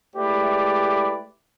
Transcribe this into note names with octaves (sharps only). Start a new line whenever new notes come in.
G#3 A3 E4 G4 B4 D5